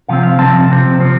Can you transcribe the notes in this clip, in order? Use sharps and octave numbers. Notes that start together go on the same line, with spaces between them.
C3 F3 C4 F5
F5
C3 F3 C4 A5
C3 F3 C4
C3 F3 C4